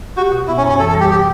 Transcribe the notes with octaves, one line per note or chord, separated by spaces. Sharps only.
F#4 G4
B2
B3 E4
C#4
F#2
C#4
E3 A4
A4
G3
G4
B2 G4